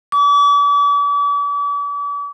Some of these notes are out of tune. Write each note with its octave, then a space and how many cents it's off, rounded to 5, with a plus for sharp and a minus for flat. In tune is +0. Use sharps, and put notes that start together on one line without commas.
D6 -40